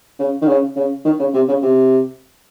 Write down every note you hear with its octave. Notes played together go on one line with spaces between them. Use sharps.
C#3
D#3
C#3
C#3
D#3
C#3
C3
C#3
C3